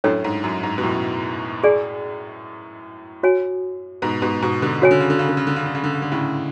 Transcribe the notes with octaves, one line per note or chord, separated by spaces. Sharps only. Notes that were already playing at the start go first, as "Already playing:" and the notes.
F#2 A2 D4 A4 C#5
G#2
F#2
G#2
B2
F#2 A2
G#4 D5 G#5
F#4 C#5 G#5
G#2 B2
G#2 B2
G#2 B2
B2 D3
C#3 F#4 C#5 G#5
D3
C#3
D3
C#3
D3
C#3
D3
C#3
D3
C#3
D3
C#3
D3
A2 C#3